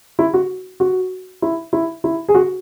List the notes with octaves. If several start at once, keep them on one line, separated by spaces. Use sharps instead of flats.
E4
F#4
F#4
E4
E4
E4
G#4
F#4